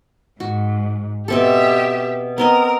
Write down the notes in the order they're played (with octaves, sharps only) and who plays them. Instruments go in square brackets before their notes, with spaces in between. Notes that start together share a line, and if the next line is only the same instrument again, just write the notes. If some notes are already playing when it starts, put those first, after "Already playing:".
[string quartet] G#2 [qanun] F#4
[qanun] B2 C4 A4 [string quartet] G4 E5
[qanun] B3 C4 D#5 [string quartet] A#4